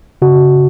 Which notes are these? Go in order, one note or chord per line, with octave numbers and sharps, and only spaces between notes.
C#3 F#4